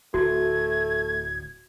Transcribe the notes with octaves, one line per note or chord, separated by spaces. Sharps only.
D1 A3 F#4 G#6